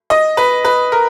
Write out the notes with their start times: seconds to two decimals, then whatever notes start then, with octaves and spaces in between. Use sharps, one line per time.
0.10 D#5
0.37 B4
0.65 B4
0.92 A#4